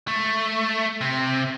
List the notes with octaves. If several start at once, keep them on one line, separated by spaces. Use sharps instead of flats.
A3
C3